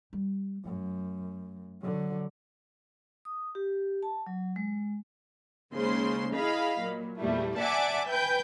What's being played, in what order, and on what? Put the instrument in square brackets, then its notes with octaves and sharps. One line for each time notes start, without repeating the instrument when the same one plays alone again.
[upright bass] G3
[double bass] F#2 [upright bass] A3
[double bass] D3 F#3
[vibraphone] D#6
G4
A5
F#3
G#3
[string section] D#2 C#3 G#3 C5 C6
E4 G#4 D#5 F5 B5
A#2 F#3
E2 A#2 G3 A3 E4
D5 E5 F#5 G#5 A5 D6
B4 G5 G#5 G6